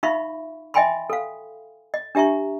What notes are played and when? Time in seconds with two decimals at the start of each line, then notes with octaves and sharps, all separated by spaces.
0.03 D#4 F4 E5 F5 B5 C#6
0.74 D#5 E5 G5 G#5 B5 C6
1.10 A4 F5
1.94 D#5
2.15 D4 G4 E5 A#5 C#6